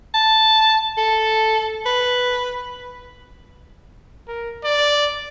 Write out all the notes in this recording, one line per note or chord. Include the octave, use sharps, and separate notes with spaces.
A5
A4
B4
A#4
D5